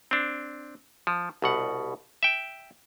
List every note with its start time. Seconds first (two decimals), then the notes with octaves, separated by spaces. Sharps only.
0.11 C4 D4
1.07 F3
1.42 C2 B2 F#5
2.23 E5 G5